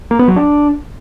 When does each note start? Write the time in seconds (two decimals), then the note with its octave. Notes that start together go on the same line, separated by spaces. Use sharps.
0.11 A#3
0.19 B3
0.28 F#3
0.36 D4